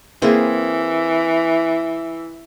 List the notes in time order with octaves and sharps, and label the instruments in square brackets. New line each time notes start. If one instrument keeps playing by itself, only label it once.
[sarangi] E3 [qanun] A#3 C4 G#4